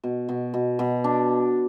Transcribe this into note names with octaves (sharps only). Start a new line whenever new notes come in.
B2
B2
B2
B2
D4